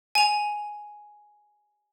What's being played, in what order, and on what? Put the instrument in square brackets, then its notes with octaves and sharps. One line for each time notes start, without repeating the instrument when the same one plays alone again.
[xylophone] G#5 F7